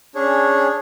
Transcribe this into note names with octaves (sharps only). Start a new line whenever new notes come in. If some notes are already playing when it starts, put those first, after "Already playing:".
C#4 D4 G#4 C#5